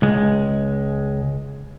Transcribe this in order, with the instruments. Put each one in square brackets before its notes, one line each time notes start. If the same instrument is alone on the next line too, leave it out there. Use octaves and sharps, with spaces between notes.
[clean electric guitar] C#2 G#3